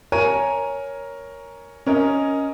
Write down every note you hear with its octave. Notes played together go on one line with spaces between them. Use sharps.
A#4 C#5 G#5 A#5 D#7
C#4 A#4 D#5